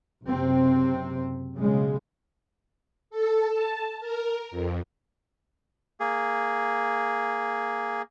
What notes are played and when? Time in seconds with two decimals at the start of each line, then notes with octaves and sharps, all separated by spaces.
0.25 F#1 C3 C4
1.55 B1 C#3 G#3
3.10 A4
3.49 A5
4.00 A#4
4.51 F2
6.00 A#3 G#4